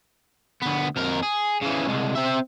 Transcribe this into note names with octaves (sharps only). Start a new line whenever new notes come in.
D2 B3
F2 A#4
G#4
C#3 E3
C2 G#3
C4 E5